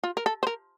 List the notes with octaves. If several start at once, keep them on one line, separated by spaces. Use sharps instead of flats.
F4
A#4
A4
C5
A#4